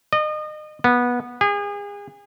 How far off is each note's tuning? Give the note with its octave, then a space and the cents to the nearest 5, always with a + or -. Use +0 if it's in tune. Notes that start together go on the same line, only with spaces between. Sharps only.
D#5 -35
B3 -15
G#4 -35